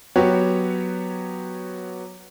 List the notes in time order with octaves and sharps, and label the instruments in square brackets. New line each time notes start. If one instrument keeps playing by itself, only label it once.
[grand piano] F#3 B3 F#4 G4 C#5